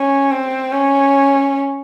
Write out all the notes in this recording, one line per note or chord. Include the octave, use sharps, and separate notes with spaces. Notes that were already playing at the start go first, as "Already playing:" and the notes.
Already playing: C#4
C4
C#4